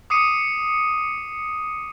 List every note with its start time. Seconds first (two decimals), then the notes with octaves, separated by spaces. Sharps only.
0.10 D6 D#6 C7 C#7 D#7